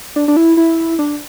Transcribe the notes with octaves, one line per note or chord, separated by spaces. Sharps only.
D4
D4
E4
E4
D4